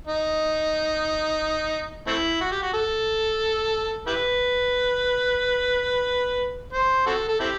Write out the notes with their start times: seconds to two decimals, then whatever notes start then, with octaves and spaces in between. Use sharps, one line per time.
0.07 D#4
2.07 A3 C4 E4
2.41 F#4
2.51 G4
2.62 F#4
2.74 A4
4.07 E4 G4 B4
6.73 C5
7.06 C4 F#4 A4
7.28 A4
7.40 C4 E4 G4